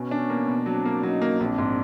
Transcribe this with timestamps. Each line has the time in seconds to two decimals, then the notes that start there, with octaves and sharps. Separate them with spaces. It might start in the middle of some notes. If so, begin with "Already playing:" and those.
Already playing: B2 B3 C#4
0.11 D4
0.30 A#3
0.48 B2
0.66 F#3 C4 D4
0.85 A#3
1.03 F#3 C#4 D#4
1.22 A#3
1.40 A#1 C4 D4
1.58 G#2